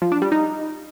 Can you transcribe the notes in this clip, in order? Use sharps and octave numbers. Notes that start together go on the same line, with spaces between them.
F3
D4
G3
D#4